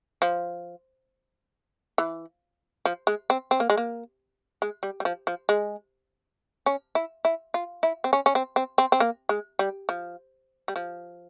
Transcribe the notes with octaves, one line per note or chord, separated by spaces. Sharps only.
F3
E3
F3
G#3
C4
C4
A#3
G#3
A#3
G#3
G3
G3
F3
F3
G#3
C#4
E4
E4
F4
E4
C4
C#4
C#4
C4
C4
C4
C4
A#3
G#3
G3
F3
G3
F3